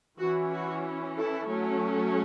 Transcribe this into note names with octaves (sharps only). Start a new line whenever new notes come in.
E3 C#4 F#4
F#4
E4 A4
F#3 A3 C#4